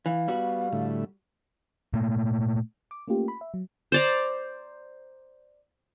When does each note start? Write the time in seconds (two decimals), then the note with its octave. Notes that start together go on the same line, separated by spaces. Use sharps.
0.06 E3 F5
0.28 G3 B3 F#4
0.73 A2 D3 A3
1.93 A#2 A3 A#3
2.91 D6
3.08 A3 A#3 C#4 F4 G4
3.28 B5
3.41 E5
3.54 F#3
3.92 C5 D5 A#5